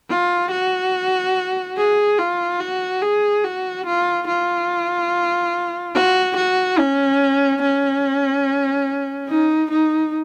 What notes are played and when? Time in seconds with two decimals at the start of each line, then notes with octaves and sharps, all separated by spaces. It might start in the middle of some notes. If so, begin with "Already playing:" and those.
0.10 F4
0.51 F#4
1.77 G#4
2.19 F4
2.60 F#4
3.02 G#4
3.44 F#4
3.86 F4
4.28 F4
5.95 F#4
6.37 F#4
6.79 C#4
7.62 C#4
9.29 D#4
9.71 D#4